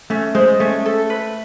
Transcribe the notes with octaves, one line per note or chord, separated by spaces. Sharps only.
A3 C#4
G#3 C5
A3 C#4
A4
B4